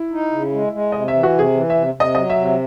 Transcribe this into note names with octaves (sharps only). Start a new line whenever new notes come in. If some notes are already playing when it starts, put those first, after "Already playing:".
Already playing: E4
D#4
C#3
G#3
G#3
C3 D#5
E5
E3
F#4
C3
G#4
E3
C3 E5
C3
D#5
F#3 D#5
E5
C3
E5